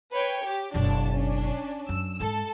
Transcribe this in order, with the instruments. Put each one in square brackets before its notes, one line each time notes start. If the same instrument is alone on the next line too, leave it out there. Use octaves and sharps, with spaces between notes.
[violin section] B4 C#5 G5
G4
[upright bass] F#1 B2 [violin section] D4 C#5 A5
[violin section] C#4 D4
[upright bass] F#2 [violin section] E6
[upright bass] G#2 [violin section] A4